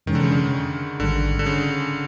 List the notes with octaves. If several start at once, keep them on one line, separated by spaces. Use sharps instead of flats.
F2 C3 D#3 E3 G#3 C#4
D3
C#3
D3
A1 G#2 D3 D#3 G3
D3
C#3